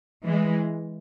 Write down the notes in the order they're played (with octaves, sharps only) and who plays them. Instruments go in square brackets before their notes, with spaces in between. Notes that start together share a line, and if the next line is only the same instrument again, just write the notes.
[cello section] E3 G#3